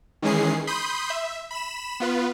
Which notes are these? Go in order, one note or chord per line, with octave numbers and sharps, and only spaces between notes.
D#3 E3 G#3 C#4 G#4 C7
B5 C6 D#6 G6
E5
B5 E7
B3 F4 B4